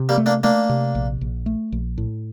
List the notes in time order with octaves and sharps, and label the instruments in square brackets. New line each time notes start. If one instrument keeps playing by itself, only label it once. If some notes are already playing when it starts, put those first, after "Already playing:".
Already playing: [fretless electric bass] C3
[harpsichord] G3 A#3
[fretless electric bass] A3
[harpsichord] A#3 D4
[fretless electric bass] A3 [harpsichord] A#3 D4
[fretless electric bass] C3
A#1
A#1
A3
A#1
A2